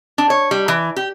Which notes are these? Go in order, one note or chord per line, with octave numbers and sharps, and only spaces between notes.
D4
C#5
G3
E3
G4